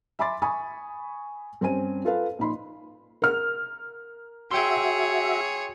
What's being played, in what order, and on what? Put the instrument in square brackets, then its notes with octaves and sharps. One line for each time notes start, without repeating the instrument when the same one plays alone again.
[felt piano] E5 G#5 B5 C6 D6 A6
G#5 B5 C#6 D#6
G2 C4 C#4 G#5 D#7
F4 A4 B4 F5
A#1 D#4 B5 C6
A#4 F6
[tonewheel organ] F#4 E5 [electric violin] G#4 C#5 [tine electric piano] G5 C6